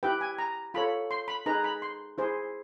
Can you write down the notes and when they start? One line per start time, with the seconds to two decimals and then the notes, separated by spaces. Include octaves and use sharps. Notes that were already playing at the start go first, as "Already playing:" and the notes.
0.03 E4 G4 B4 G5
0.21 G#5
0.39 A#5
0.74 F4 A4 C#5 B5
1.11 C6
1.28 B5
1.46 D#4 G#4 B4 A#5
1.64 B5
1.82 C6
2.18 E4 G#4 C5